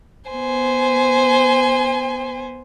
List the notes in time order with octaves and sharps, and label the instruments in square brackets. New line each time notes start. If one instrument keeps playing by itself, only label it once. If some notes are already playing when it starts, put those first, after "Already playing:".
[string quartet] B3 C5 G#5